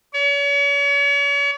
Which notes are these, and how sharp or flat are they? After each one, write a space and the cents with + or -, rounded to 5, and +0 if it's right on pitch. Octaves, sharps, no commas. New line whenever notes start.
C#5 +40